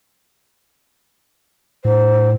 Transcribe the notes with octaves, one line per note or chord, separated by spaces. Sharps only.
A2 C5